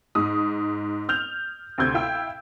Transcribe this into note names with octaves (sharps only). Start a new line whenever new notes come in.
G#2 D#6
F6 G6 F7
D2 C3 C4 E6 G6 G#6
E4 F5 G5 E6